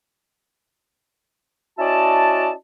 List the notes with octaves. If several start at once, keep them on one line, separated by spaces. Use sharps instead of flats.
C#4 E4 F#4 D5 D#5 A5